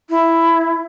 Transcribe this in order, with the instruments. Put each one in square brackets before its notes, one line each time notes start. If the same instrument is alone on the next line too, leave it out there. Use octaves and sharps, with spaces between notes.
[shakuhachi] E4